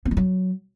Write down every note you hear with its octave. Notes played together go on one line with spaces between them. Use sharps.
B3
G#3
F#3